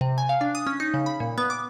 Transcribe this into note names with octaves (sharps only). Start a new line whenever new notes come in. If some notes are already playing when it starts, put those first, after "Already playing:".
C3
G#5
F5
D4
D#6
C#4
D#4
C#3
B5
A#2
B3
D6